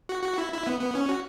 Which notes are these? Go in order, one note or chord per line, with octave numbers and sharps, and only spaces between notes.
F#4
F#4
E4
E4
B3
B3
C#4
F#4